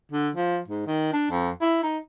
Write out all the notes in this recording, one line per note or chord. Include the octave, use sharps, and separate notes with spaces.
D3
F3
G#2
D#3
D4
F2
E4
D#4